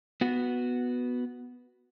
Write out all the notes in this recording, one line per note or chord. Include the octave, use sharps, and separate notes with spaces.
B3 F#4